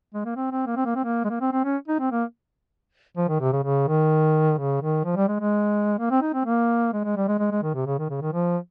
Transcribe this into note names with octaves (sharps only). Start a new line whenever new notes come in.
G#3
A#3
C4
C4
A#3
C4
A#3
C4
A#3
G#3
A#3
C4
C4
C#4
D#4
C4
A#3
F3
D#3
C3
C#3
C#3
D#3
C#3
D#3
F3
G3
G#3
G#3
A#3
C4
D#4
C4
A#3
G#3
G#3
G3
G#3
G#3
G#3
D#3
C3
C#3
D#3
C#3
D#3
F3